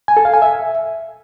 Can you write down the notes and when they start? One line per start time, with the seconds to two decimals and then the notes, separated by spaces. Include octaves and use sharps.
0.08 G#5
0.17 A4
0.25 F5
0.34 G#5
0.42 E5